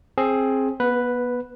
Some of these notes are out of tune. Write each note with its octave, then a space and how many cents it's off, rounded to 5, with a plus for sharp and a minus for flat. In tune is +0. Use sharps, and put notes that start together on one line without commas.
C4 +20 G#4 +15
B3 -30 B4 +0